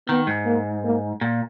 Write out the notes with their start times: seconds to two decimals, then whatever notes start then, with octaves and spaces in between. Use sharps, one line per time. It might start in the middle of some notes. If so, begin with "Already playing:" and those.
0.08 D#3 B3
0.27 G#2
0.46 A#3
0.84 A#3
1.21 A#2